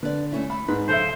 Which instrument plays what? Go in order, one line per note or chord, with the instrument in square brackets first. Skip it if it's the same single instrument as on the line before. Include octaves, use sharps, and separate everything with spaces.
[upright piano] D3 [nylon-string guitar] B4 D5
[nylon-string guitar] A3 C#4 E4
[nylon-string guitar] A3 [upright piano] B5
[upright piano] G#2 [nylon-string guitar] B4
[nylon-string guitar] C#3 F3 [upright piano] A4 E5 [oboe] C5